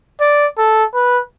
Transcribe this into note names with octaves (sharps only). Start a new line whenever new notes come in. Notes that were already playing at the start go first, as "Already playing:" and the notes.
D5
A4
B4